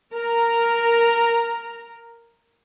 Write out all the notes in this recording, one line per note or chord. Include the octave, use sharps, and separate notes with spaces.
A#4 A#5